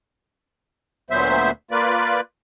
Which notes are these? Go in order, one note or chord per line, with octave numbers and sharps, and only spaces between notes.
D2 A#2 F#3 B3 C5 E5
A#3 F4 B4 D5